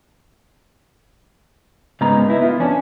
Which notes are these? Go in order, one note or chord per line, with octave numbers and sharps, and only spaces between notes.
G#2 C#3 B3 D#4 B4 A#5
B3 D#4 E4 E5
B3 F4
F2 C#4 D4